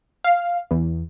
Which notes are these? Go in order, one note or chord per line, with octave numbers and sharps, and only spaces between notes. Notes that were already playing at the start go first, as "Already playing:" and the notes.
F5
E2